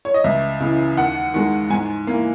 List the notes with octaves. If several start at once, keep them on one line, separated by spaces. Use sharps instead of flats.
C#5
D#5
C#2 E5
C#3 E3
D#2 F#5
D#3 G#3
G#2 G#5
E3 A#3